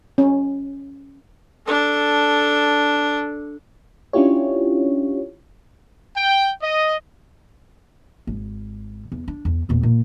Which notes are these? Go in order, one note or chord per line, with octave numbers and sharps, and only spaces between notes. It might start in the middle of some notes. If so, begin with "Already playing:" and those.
C#4
D4 A4
C#4 D4 E4 F4 G4 C#5
G5
D#5
G#1
E2
D4
E2
E2 A#2
A#2